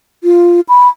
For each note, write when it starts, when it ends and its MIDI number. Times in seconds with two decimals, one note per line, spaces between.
0.24 0.61 65
0.69 0.88 83